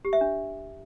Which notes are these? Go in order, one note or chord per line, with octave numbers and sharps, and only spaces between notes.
G4
E5
D4